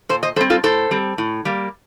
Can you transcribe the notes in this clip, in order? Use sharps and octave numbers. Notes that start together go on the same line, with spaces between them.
A#2 A4 C5
C5 D#5
G3 C4 A4 C5
F4 A4
A2 A4 C5
G3 C4
A2
G3 A#3